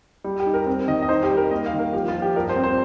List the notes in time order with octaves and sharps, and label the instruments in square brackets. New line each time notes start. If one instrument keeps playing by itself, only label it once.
[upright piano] G3
G4
D#4
A#4
C4
D#3 D#5
D#5
D#4 C5
G4
G3
A#4
A#3 D#5
F5
D#3
A#4
F3 G4
F4
F3
G4
G2 A#4
C5
C4
C5